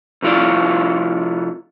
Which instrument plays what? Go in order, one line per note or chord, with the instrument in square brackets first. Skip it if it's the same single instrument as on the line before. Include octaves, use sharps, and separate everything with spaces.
[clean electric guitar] C3 F3 E4 F4 D5